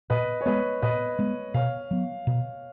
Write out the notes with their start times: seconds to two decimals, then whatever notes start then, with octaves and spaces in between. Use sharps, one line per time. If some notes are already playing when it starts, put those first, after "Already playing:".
0.10 A#2 B4 D#5
0.41 C#5
0.46 G#3 B3 B4 D#5
0.82 A#2 B4 D#5
1.19 G#3 B3
1.54 B2 C#5 F5
1.91 F#3 B3
2.27 B2